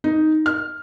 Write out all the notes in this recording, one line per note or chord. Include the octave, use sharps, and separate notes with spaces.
D#4
F6